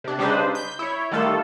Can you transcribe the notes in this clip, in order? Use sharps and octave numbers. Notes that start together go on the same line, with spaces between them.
C3 D4
C#3 G3 D4 D#4 B4 C5
G6 B6
E4 C#5
D#3 G3 A3 F4 A4